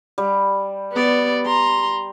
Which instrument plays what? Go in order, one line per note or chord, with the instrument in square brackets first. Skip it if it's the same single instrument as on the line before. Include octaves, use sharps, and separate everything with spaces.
[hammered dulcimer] G3
[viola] B3 D5
A#5 C6